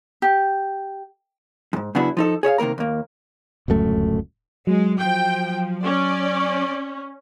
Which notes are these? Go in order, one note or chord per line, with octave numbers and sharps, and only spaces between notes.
G4
F2 G#2
C#3 F#3 B3 D4 E4 F#4
F3 D#4 A4
G#4 C#5 E5 F5
C3 D#3 A#3 A#4 A#5
D#2 A#3
D1 C#2 F#2 A3
F#3 G#3
F3 G5
C#4 D5